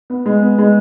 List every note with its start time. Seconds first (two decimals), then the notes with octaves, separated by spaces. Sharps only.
0.10 B3
0.26 G#3
0.42 B3
0.58 G#3